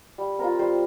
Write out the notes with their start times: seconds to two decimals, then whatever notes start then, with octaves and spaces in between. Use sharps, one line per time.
0.18 G3
0.39 C4 F4 A#4
0.59 G3 C5